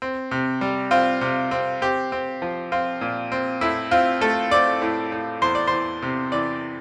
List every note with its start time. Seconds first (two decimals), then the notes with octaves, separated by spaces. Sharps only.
0.02 C4
0.31 C3
0.61 G3
0.91 C4 F4
1.21 C3
1.51 C4
1.82 C4 G4
2.12 C4
2.42 F3
2.72 C4 F4
3.01 A#2
3.32 C4
3.61 A2 E4
3.91 C4 F4
4.21 A3 A4
4.51 C4 D5
4.82 A2
5.12 A2
5.42 E2 C5
5.55 D5
5.67 E3 C5
6.02 C3
6.32 E3 D5